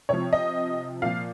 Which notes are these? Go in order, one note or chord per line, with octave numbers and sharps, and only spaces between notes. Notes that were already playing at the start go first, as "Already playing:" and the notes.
C3 F3 C#5
D#5
A#2 F3 F5